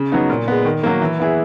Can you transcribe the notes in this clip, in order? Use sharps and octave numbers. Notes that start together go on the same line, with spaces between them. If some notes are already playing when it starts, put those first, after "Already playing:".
Already playing: C#3
F#3 B3 D#4
A#2
G#3 B3
D#3
F#3 A#3
E3
B3 E4 G#4